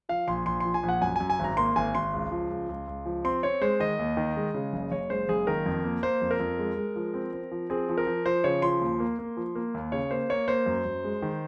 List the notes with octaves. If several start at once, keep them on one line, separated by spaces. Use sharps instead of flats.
F3 F5
A#1 C6
A#1 C6
F3 C6
G#5
A#1
F#5
F#2 G#5
F#2 G#5
G#5
G#1
A#5
A#3 C6
G#1 G#5
G#1 C6
C#2
F3
C#2
C#2
C#2
F3
C4 C6
C4 C#5
G#3 C5
D#3 D#5
D#2
D#3
G#3
C#3
F#1
F#1 C#5
G#3 C5
F#1 G#4
D#3 A#4
F2
A#3
A#3 C5
F2
A#4
F2
G#3
G#3
F3
C4
C4
F3
C4 G#4
F3
A#4
F3
F3 C5
C#3 C#5
F3 C6
D#2
A#3
A#3
F3
A#3
D#2
C#3 C#5
A#3 C5
A#3 C#5
A#3 C5
F#2
F#2
G#3
D#3